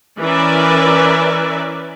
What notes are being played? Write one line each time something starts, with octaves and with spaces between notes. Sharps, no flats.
E3 C#4 A#4 B4 D5 E5